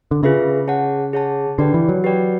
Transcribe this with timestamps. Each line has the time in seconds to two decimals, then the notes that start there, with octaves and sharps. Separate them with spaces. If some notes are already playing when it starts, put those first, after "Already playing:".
0.11 D3
0.23 C#3 F4 G#4 B4 E5
0.68 G#4 C#5 F#5 A5
1.13 G#4 C#5 F#5 A5
1.58 D3 G4 B4 D5 G5
1.74 E3
1.89 F#3
2.04 G4 B4 D5 G5